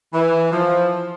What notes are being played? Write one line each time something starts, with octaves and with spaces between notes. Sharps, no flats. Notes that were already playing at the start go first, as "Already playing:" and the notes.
E3
F3